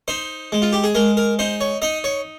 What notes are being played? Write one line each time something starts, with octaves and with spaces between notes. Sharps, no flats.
D#4 C5
G#3
F4
G4
G#4
G#3 A#4
A#4
D#4 C5
C#5
D#4 D#5
C#5